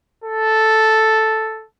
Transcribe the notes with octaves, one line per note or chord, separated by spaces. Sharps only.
A4